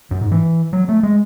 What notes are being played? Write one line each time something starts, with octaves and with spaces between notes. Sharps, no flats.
F#2
G#2
E3
F#3
A3
G#3